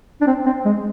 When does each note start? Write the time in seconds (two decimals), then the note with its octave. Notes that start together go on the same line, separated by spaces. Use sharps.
0.21 D4
0.27 C4
0.46 C4
0.65 G#3